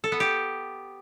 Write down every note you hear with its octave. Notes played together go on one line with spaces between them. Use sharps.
A4
B3
G4